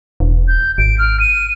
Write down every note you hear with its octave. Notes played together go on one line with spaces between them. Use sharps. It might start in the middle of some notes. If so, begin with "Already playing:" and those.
E1
G6
G#1 D7
F6
D#7